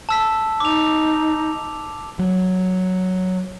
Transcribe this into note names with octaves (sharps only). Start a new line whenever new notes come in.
A5 E6 B6
D#4 D6 F7
F#3